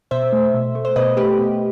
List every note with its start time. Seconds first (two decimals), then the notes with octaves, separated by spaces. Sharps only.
0.11 B2 C5 E5
0.33 A3
0.54 B2
0.75 A3
0.85 C5
0.96 B2 B4 D#5
1.17 A3 G4 B4
1.39 B2